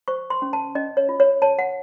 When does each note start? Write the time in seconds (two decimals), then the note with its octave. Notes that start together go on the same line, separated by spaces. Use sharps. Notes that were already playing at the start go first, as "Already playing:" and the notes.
0.08 C5 C#6
0.30 C6
0.42 C#4
0.53 A5
0.75 C#4 D#5
0.97 C#5
1.09 F4
1.20 C#5
1.42 C#5 A5
1.59 F#5